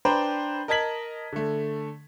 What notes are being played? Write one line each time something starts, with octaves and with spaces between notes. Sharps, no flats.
D4 B4 C5 G5 A#5
A#4 D#5 A5 G#6 B6 F#7
D3 A3